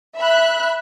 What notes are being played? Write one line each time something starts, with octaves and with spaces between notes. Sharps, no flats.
E5 B5 F#6